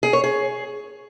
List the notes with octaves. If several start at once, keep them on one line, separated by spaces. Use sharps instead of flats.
G#4
C#5
G#4